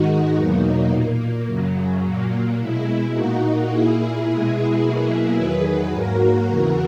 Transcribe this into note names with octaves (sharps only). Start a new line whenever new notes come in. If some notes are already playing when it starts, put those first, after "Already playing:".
Already playing: G#2 D#3 G#3 D#4 F#4
E2 B2 F#3 A#3 D#4
A#2 A#3
F#2 C#3 F#3
A#2 F#3 A#3
B2 G#3 E4
A#2 A#3 D#4 F#4
A#2 A#3 E4 G#4
B2 G#3
B2 F#3 A#3
E2 D#3 F#3 G#4 B4
G#2 F#3 A#3 F#4 A#4
E2 C#3 E3